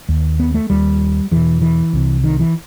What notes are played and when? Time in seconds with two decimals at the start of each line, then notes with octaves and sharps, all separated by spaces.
0.09 D#2
0.40 B3
0.54 A3
0.70 D#2 G3
1.31 E2 B2 E3
1.62 E3
1.93 C2 C3
2.24 D#3
2.40 E3